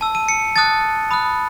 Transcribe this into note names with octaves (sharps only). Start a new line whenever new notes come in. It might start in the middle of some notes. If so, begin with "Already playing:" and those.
A5 E6
D#7
C#7
A5 D#6 F#6 A6
B5 D#6 F#6